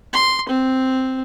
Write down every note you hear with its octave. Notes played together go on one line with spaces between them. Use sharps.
C6
C4